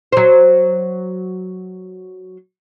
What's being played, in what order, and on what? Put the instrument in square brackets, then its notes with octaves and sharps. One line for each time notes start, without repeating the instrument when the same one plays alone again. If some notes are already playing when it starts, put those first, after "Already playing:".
[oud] F#3 C5